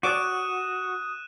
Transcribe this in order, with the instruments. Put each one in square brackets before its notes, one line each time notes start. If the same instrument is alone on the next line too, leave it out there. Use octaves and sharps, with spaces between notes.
[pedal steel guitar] F#4 [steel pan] C#5 D5 D6 [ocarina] D#6 [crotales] F#6 D#7 E7